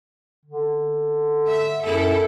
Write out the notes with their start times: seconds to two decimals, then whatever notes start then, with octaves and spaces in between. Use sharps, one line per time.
0.45 D3
1.48 E5
1.83 F#2 E4 A4